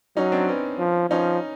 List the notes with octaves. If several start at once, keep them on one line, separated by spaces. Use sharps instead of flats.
F#3 C#4 D#4
C4 D4
B3 C#4
F3
F3 C#4 D#4